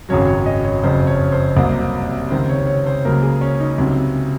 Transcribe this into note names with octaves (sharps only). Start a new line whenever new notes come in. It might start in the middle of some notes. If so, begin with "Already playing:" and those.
G#1 F#2 C#3 F#3 C#5
C#5
D#5
C#5
F#1 F2 C#3 F#3 C5
C#5
C5
C2 C3 F#3 A#3 C5
C#2 C3 D#3 C5
C#5
C#5
C5
C#2 C#3 F#3 A#3 A#4
G#4
C#4
D#4
C#2 C3 F#3